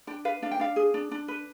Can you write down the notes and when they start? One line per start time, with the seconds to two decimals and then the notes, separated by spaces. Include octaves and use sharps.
0.07 D4 G5
0.25 B4 F5
0.42 D4 F5
0.51 G5
0.60 D4 F5
0.76 G#4
0.94 D4
1.11 D4
1.28 B4